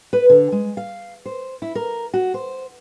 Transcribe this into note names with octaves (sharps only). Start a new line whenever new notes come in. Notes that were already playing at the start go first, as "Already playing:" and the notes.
B4
D3
G#3
F5
C5
E4
A#4
F#4
C5